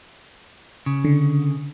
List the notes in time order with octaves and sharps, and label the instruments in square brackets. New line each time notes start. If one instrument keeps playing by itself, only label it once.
[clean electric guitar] C#3
[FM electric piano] D3